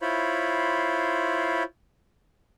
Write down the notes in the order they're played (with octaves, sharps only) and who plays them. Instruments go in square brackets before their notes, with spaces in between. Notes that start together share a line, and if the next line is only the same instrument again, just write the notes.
[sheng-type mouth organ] E4 F4 C5 C#5 B5